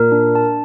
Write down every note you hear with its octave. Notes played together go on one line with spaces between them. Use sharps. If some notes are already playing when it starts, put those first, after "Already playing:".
Already playing: A#2 A#4
D4
A5